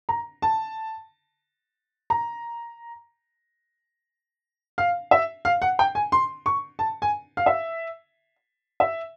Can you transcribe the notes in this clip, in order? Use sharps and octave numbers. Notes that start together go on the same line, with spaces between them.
A#5
A5
A#5
F5
E5
F5
F#5
G5
G#5
C6
C#6
A5
G#5
F5
E5
E5